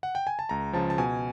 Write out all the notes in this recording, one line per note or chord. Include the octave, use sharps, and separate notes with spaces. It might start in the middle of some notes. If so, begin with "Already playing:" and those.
F#5
G5
G#5
A5
C#2 A#5
C#3 F3 A5
A5
B2 G#5